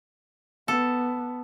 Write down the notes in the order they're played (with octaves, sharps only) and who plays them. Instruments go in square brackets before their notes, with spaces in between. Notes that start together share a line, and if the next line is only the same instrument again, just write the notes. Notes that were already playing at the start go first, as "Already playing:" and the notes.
[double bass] B3 [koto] A4